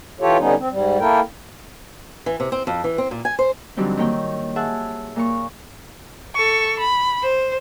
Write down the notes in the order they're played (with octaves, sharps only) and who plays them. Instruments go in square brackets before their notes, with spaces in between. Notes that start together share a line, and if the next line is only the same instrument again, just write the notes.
[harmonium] E3 F4 G4 A4 C#5
D3 G3 B3 C#4 D#4
C4
G#2 G3
A#3 E4 A4 A#4 G5
[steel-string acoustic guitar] E3
C3
C4
F2
E3
C4
A#2
G#5
C5
[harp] D3 E3 F#3 G3 C4 D#4
D#3 A#3 C#5 G5
G#4 E5 F#5 A5
A#2 F5 C#6
[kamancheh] A4 C#6
B5
C5